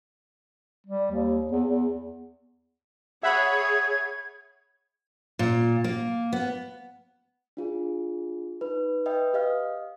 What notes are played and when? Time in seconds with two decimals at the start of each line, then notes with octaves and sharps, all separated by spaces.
0.86 G3
1.11 D#2
1.52 E2
1.68 E2
3.23 G#4 C#5 E5 F#5 B5 G#6
5.39 A#2
5.84 A#3
6.33 B3
7.57 D4 F4 G#4
8.61 D#4 B4
9.06 B4 D#5 E5 G5
9.34 G4 D#5 F5 F6